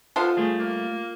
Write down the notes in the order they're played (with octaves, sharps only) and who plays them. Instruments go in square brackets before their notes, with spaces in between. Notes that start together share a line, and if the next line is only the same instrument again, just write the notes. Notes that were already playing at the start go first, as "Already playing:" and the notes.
[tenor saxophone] B3 [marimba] F4 [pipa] A4 C5 F5
[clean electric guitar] G3 A3 [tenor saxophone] G#4
[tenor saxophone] A#3